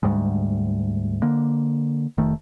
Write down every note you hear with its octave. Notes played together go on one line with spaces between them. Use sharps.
D2 G#2 G3 G#3
D3 A#3
F1 D#3 A3